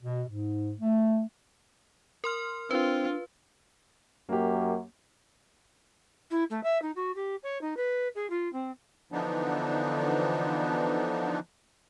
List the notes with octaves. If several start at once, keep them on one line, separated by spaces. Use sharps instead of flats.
B2
G#2
A3
A#4 C6 F6
C4 D4 F4 B4
F#2 A#3 G4
E4
A3
E5
D#4
F#4
G4
C#5
D#4
B4
G#4
F4
C4
D3 E3 F3 B3 D4 D#4